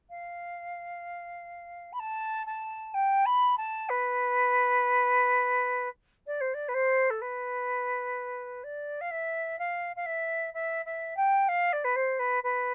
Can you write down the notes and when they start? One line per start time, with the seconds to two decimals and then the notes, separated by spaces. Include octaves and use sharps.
0.10 F5
1.92 B5
1.99 A5
2.46 A5
2.94 G5
3.25 B5
3.57 A5
3.89 B4
6.26 D5
6.40 C5
6.54 D5
6.68 B4
6.74 C5
7.10 A4
7.21 B4
8.63 D5
9.01 F5
9.11 E5
9.58 F5
9.96 F5
10.06 E5
10.54 E5
10.85 E5
11.16 G5
11.48 F5
11.72 D5
11.84 B4
11.95 C5
12.19 B4
12.43 B4